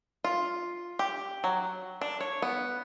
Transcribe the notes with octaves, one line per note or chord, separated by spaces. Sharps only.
F4
G4
F#3
D4
C#5
B3